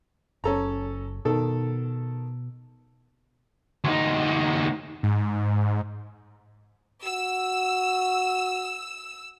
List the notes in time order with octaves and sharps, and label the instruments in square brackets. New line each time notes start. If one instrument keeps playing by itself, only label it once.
[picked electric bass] F#1 [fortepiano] C#4 A4 A#5
[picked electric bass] B2 [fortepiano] D#3 A4
[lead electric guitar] D2 D#4
[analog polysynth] G#2
[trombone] F#4 [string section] E6